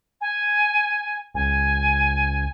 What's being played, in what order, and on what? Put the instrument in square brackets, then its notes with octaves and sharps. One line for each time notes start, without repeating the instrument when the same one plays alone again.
[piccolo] G#5
[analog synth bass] C#2 [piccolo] G#5